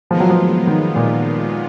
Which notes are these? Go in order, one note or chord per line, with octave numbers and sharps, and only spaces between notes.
D#3 F3 G#3 B3 F4
F#3
F3
D#3
A#2